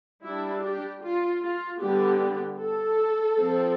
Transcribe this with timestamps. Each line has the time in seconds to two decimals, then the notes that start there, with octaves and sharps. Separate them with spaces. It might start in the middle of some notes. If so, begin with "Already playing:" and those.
0.24 G3 D4 E4
0.63 G4
1.02 F4
1.42 F4
1.80 D3 G3 B3 G4
2.59 A4
3.37 F3 C4